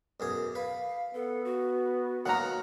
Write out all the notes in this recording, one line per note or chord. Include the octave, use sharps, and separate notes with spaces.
B1 F#2 G#4
B4 F5
B3 A4
F#4
D#3 F#3 A#3 F#5 A#5